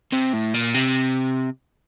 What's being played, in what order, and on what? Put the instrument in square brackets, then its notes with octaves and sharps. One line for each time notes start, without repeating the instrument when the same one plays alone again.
[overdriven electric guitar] C3
A2
A#2
C3